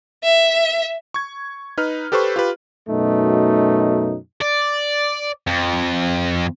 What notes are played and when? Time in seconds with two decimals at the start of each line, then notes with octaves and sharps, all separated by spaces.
0.23 E5
1.14 C#6 G#6
1.78 D#4 B4 F6
2.12 G4 A4 B4 C5 C#6
2.36 F4 G4 B4
2.88 F#2 B2 A3 D#4
4.41 D5
5.47 F2